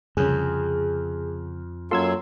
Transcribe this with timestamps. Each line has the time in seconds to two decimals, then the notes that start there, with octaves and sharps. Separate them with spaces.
0.17 C2 F2 C#3 G#4
1.91 F#2 F#3 A#3 F4 A4 C6 E6 G#6